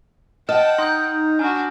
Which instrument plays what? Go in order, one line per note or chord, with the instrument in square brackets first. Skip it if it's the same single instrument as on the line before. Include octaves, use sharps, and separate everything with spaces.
[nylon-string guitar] D#5 [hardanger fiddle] F#5 G5 [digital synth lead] A5 [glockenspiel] F6
[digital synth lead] D#4 [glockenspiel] C6 D#6 G6
[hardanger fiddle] D4 F#4 [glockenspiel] G#5 A#5 F6